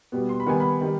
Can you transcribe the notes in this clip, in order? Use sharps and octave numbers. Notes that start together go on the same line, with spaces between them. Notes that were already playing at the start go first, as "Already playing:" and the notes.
B2 G3 B3
C6
B5
D#3 G3 B3 G#5
B5
D#3 G3